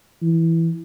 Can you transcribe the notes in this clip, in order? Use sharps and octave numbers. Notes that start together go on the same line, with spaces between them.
E3